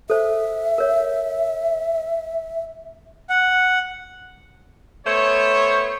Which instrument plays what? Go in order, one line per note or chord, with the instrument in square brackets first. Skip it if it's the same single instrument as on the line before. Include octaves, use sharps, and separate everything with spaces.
[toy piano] A4 C5 [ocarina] E5
[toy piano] A#4 C#5
[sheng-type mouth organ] F#5
[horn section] A3 B3 C5 C#5